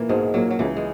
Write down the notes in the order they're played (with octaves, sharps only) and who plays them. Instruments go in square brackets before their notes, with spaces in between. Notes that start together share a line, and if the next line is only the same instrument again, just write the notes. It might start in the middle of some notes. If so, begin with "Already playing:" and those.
Already playing: [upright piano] A#2 A#3 [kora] E3
[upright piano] B1 [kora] G#2 G#3
[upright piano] A#2 A#3 [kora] F#3
[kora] F#3
[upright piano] C#2 [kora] E3
[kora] G#3